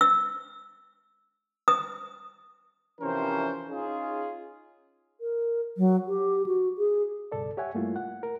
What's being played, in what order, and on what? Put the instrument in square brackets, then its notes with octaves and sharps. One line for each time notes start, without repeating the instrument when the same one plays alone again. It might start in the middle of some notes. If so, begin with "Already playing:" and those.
[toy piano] E6
D#6
[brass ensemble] C3 E3 F3 C#4 A#4 C5
C#4 D#4 F4 G#4
[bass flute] A#4
F#3
G4
F#4
G#4
[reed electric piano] C#2 G2 B2 A4 D5
G4 C#5 E5 F#5 G#5
G2 G3 A3 A#3 E4 F4
F#5
A#4